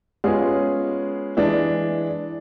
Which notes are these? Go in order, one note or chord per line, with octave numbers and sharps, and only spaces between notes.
G#3 B3 C#4 F4 G#4
E3 G#3 D4